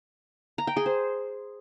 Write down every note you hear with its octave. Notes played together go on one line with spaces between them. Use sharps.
A#5
G5
G#4
C5